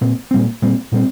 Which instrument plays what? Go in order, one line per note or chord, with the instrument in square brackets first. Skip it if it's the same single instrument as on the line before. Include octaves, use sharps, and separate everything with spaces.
[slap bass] A#2 G3 C4
A#2 G3 C4
A#2 G3 C4
A#2 G3 C4